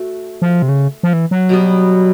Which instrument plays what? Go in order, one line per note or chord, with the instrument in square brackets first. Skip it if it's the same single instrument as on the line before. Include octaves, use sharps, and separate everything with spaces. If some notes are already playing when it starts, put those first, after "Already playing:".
Already playing: [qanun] A3 F#4
[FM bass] F3
C3
C#3
F3
E3
F#3
[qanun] B2 G3 B3